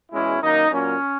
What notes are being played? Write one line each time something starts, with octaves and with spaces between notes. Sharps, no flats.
E2 B2 G#3 C#4 E4
F#2 D#3 A#3 D#4
A#2 F#3 A#3 C#4